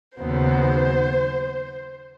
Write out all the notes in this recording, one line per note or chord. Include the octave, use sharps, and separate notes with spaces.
D#2 C#3 F#3 B3 C5